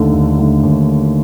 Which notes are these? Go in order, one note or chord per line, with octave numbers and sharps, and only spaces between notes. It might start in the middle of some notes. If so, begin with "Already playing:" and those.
Already playing: D#2 D3 A3 D#4
D#2
D3 A3 D#4
D#2